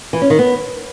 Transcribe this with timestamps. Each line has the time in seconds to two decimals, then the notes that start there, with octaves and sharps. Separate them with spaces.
0.13 E3
0.22 C#4
0.30 D#3
0.39 B3